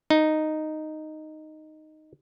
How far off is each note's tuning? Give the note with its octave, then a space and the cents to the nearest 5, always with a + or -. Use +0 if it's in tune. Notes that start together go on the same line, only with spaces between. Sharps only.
D#4 -5